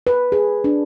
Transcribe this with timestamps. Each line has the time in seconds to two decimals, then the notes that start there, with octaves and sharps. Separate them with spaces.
0.07 B4
0.32 G#4
0.64 D4